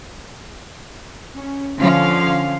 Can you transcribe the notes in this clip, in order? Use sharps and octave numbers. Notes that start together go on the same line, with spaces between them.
C#4
D3 F3 C#4 F5